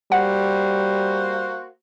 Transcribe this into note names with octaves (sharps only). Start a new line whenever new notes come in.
G3 A#3 F#4 C5 F#5